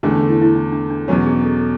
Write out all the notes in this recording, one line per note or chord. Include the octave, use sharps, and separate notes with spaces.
E2 D3 A3 C#4
D4
E4
E4
D4
D4
D4
E2 B2 F#3 C#4 F#4
G#4
A4
A4